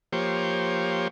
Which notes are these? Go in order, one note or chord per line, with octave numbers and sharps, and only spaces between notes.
F3 A#3 G4 C5 C#5